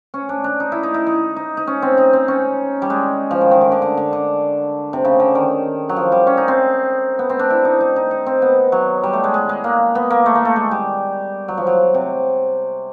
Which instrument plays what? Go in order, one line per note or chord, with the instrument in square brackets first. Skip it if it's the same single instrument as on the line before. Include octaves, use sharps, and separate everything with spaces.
[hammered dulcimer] C#4
D4
D4
D#4
E4
D#4
E4
D#4
D#4
D#4
C#4
C4
D#4
C4
C#4
G3
G#3
F3
D#3
D#3
D3
D3
D3
D3
D3
C3
C#3
D3
D#3
F#3
F3
G3
C#4
D#4
C4
B3
C4
D4
E4
D#4
D#4
D#4
D#4
C4
B3
F#3
G3
A3
G#3
G#3
G#3
A#3
B3
A#3
A3
A#3
A3
G#3
G3
F#3
F3
F#3
C3